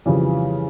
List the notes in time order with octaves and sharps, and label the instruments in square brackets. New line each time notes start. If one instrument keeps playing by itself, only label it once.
[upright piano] F2 C#3 E3 G3